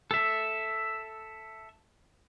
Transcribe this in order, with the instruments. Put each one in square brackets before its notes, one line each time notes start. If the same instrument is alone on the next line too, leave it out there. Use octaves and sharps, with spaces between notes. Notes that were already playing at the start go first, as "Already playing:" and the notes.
[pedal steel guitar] A4 E5